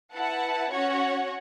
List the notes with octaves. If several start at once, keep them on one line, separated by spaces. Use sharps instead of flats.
E4 B4 F#5 A5
C#4 F#4 C#5 F#5